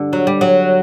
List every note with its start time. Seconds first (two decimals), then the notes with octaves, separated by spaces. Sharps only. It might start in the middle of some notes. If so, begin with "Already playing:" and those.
Already playing: G2 D3
0.13 F#3
0.27 G3
0.41 F#3